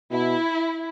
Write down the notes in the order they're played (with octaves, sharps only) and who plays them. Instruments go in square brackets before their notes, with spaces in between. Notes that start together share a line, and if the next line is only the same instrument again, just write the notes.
[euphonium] B2 [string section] E4